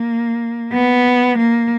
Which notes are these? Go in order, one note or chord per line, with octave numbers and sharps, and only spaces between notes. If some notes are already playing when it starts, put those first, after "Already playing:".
Already playing: A#3
B3
A#3